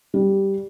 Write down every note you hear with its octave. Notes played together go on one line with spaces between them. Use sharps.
G3